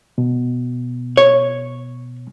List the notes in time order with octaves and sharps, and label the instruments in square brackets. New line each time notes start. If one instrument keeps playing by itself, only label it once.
[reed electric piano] B2
[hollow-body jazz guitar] C#5